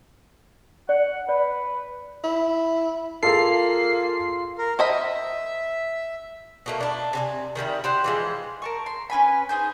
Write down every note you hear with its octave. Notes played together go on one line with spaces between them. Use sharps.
D5 F#5
B4 D5
E4
A#3 F4 G#4 A4 F5 A#5 C7
A#4
C5 D#5 E5 B5
B2 A3 A#3
D4 E4
C3 A4 G#5
D#3 G3 A3 E4
G4 C5 F#5
E3 F3 G#3
A#4 A5 C#6
C6
C#4 B4 G#5 B5
D#4 G#4 C5 G6